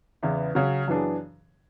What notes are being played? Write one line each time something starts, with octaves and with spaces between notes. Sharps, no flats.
E2 C#3 E3 B3 E4
C#3 F#3 C#4
F#2 E3 B3 D4 G#4